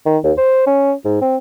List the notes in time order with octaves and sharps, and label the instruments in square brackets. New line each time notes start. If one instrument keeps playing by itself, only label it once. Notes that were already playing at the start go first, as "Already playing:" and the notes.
[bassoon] D#3
D#2
C5
C#4
G#2
C4